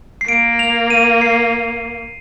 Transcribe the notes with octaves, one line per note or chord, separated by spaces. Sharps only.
C7
A#3 D7
F7
D#7
C7